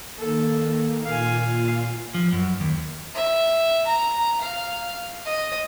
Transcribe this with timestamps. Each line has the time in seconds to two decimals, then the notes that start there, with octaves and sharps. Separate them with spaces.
0.18 D#3 A#3 A4
1.05 A#2 F4 F5 G#5
2.14 F3
2.32 F#2
2.60 D#2
3.15 E5
3.87 A#5
4.41 F5
5.26 D#5